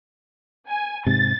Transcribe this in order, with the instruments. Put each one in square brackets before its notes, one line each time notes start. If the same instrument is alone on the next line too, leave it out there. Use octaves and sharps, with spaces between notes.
[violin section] G#5
[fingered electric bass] G#2 C3 [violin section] A6